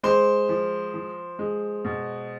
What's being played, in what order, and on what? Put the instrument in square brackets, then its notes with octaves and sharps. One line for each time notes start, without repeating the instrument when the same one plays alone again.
[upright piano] G#3 C5 C6
F3
F3
G#3
B2